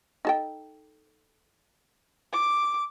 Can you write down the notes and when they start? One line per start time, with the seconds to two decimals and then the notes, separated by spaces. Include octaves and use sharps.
0.25 D#4 A4 G5
2.33 D6